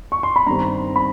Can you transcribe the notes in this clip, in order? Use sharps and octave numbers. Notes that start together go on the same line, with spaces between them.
C#6
C6
B5
G2 D#3 G3 C4 A#5
B5